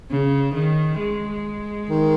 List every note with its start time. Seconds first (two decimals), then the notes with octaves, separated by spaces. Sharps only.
0.10 C#3
0.55 D#3
1.00 G#3
1.90 D#3